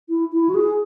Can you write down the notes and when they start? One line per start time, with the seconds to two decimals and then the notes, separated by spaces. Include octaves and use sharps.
0.09 E4
0.32 E4
0.49 F#4
0.54 G#4